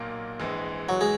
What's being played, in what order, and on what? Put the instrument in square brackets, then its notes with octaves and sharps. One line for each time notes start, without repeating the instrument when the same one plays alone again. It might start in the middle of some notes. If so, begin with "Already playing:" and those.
Already playing: [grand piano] B1 A#2 A#3
A#1 G#2 E3 G#3
[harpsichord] F#3
G#3